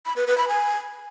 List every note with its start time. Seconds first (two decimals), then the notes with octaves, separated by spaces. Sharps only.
0.06 B5
0.16 B4
0.27 B4
0.38 B5
0.48 G#5